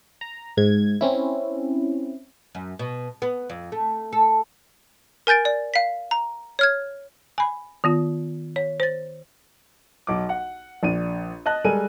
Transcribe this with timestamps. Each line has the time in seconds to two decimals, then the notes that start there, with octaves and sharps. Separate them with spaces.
0.21 A#5
0.57 G#2 G#6
1.01 C4 C#4 E4
2.55 F#2
2.79 B2
3.22 B3
3.50 F2
3.72 A3
4.13 A4
5.27 A#4 G#5 G6 A6 D7
5.45 D5
5.74 F5 B6
6.11 A#5
6.59 C#5 F6 G#6
7.38 G#5 B5
7.84 D#3 B3 F4
8.56 C#5
8.80 C5 A6
10.07 B1 D6
10.29 F#5
10.83 A#1 D4 D#7
11.46 D#5 A5 F#6
11.64 G3 G#3 A4 A#4 G#5 D#7